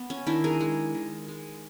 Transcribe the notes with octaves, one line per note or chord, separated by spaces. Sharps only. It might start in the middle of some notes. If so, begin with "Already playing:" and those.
Already playing: B3
C#4
D#3 D4 E4
G#4 A#4
G#3
D#3
G#3